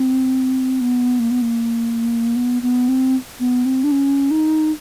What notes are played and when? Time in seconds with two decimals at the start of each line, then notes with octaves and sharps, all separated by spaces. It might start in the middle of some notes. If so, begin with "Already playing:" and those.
Already playing: C4
0.81 B3
1.20 A#3
1.31 B3
1.42 A#3
2.36 B3
2.62 B3
2.88 C4
3.40 B3
3.65 C4
3.84 D4
3.92 C#4
4.31 D#4